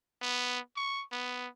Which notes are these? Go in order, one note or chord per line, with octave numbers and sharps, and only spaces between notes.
B3
C#6
B3